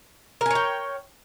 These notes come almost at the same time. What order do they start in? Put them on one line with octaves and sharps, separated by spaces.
A#4 G#5 C#5 G5